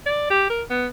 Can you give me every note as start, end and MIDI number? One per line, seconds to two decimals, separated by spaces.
0.06 0.28 74
0.30 0.45 67
0.50 0.62 70
0.70 0.87 59